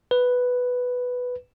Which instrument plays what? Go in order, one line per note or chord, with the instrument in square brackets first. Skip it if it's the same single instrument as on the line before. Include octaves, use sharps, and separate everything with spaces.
[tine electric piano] B4